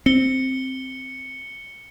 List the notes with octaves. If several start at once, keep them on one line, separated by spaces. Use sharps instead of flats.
C4 C#7 G7